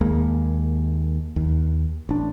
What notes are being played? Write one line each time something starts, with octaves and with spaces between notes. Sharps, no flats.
D#2 G#3 A#3
D#2
A1 D4